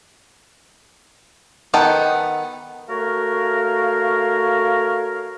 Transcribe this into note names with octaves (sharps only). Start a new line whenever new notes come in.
D#3 B3 D#4 A4 G5
A3 F#4 A#4 C#5 F5